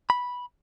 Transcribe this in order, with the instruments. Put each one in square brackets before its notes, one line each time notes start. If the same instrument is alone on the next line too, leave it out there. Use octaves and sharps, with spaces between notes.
[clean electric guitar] B5